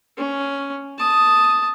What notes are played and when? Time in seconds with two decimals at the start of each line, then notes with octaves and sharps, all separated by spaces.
0.17 C#4
0.98 A5 D#6